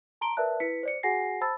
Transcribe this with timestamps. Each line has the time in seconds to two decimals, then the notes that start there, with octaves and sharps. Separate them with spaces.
0.21 A5 A#5 C6 D7 G7
0.37 A#4 B4 D5 E5 A5 F#6
0.60 E4 B4 B6 C#7
0.83 C5 D5 C#7
1.03 F#4 G#4 F#5 G#5 A#6 C7
1.41 C5 A5 B5 E6 A6